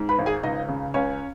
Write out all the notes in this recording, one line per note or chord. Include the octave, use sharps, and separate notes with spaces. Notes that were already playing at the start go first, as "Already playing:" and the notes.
Already playing: G#2
B4 B5
G#1
G#4 G#5
C#2 D#4 D#5
C#3
C#2 C#4 C#5